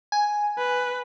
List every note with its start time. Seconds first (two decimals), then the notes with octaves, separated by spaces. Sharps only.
0.12 G#5
0.58 B4